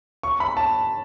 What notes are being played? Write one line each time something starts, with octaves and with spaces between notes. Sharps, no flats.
C#6
B5
A5